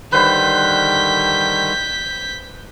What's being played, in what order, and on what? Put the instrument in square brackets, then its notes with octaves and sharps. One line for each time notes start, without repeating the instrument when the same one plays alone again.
[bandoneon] D3 D#3 G3 [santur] B4 C5 F5 [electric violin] G6 B6